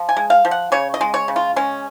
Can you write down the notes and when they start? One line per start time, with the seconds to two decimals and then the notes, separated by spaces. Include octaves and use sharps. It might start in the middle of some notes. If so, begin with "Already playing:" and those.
Already playing: F3
0.09 G#5
0.17 G#3
0.30 F5
0.45 F3
0.51 F#5
0.72 C#3 C#5
0.94 D#5
1.01 G#3
1.14 C#5
1.28 C#3
1.36 F4
1.56 G#3 C#4